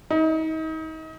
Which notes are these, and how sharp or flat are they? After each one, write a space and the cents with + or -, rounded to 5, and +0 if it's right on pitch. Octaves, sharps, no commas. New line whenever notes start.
D#4 +35